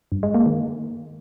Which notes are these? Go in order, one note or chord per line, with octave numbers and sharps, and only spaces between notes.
G2
G#3
A#3
D#3